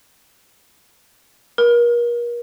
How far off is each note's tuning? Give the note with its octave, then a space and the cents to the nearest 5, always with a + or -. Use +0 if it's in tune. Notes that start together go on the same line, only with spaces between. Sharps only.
A#4 +40